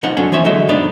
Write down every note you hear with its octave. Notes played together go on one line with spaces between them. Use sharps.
B1 F3 C#4 D#4 F#5
C2 F#2 F#3 C#4 D4 A4
E3 F3 C#4 C#5 E5
D3 F#3 G#3 F#4 D#5 E5
F#2 C3 B3 D4 D#4 D5